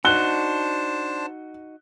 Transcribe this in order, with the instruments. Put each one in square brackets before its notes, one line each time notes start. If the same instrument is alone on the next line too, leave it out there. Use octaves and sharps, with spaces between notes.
[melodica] D4 C5 A5 [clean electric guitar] D#4 F#4 [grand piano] F#6 G7